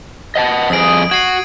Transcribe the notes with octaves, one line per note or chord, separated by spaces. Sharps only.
D#5 F#5 A5
F2 G#4 D#6 D7
F#4 G#6 C7 D#7